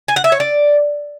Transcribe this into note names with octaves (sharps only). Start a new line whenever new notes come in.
G#5
F#5
E5
C#5
D5